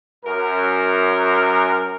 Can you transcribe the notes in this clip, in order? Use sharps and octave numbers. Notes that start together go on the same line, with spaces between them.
F#2 A#4